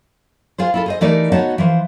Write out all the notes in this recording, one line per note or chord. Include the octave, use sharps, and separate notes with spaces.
F4 G#4 C5
E4 F4 A4
G#4 C5 D#5
E3 A3 D#4 G4 A#4 D5
B3 D#4 F#4 C#5 D#5 A5
E3 F3 C5